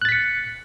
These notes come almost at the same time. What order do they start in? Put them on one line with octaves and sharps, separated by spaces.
F#6 A6 B6 C#7